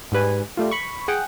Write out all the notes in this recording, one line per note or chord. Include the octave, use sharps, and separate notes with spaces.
G#2 G3 B4 G#5
G3 A3 F4
B5 C#6
G#4 F#5 G5